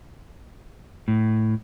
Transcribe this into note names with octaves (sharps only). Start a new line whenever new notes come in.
A2